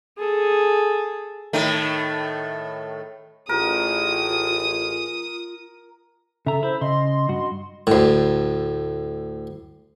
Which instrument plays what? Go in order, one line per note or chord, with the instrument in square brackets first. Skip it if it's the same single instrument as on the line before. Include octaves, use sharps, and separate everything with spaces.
[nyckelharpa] G#4 A4
[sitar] A2 D#3 A3
[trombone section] A1 G#4 [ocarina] F4 [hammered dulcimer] A#4 [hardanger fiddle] D#6
[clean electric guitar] C#3 A#5 [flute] A4 [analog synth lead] E5
[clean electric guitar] E4 [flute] C5
[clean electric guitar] C#3 [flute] D#5 [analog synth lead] C6
[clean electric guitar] G2 F#4
[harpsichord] D2 A2